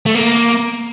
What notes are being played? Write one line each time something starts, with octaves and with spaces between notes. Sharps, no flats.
A3
A#3